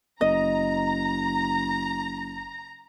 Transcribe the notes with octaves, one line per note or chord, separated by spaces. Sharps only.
F#1 D#5 A#5